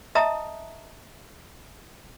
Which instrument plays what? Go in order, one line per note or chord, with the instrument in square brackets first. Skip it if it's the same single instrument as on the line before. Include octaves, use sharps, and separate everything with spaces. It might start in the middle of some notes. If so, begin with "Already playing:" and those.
[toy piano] D#5 E5 A5 A#5 D#6